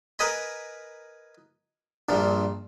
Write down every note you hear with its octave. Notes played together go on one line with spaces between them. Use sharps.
A#4 B4 D#5 G#5 B5
A#1 G2 A#2 F3